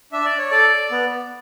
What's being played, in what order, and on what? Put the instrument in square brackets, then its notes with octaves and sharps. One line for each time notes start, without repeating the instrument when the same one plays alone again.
[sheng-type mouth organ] D4 E5
D5
C#5
A4 D5
B3